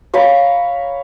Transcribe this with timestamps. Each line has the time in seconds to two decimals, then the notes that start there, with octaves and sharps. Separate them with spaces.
0.14 C#5 F5 A#5 B5